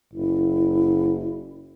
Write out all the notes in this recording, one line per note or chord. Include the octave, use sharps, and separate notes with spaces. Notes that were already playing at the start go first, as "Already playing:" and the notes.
F#1 E4